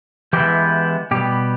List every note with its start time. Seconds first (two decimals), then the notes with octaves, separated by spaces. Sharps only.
0.33 E3 G#3 B3 E4 G4
1.11 B2 G3 B3 G4